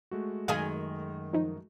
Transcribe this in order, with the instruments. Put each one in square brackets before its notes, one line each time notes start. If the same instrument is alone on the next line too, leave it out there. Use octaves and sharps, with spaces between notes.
[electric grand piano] G#3 A3 F#4
[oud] F#2 D#3 G#4 [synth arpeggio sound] F5 G#5
[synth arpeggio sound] F3 D#4